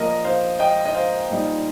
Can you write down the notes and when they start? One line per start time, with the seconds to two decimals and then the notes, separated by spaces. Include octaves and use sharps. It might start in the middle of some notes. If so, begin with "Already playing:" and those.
Already playing: A#2 F3 A#3 A#4 D#5
0.24 C5 F5
0.59 D#5 G5
0.85 D#5
0.95 C5 F5
1.30 A#2 G3 D#4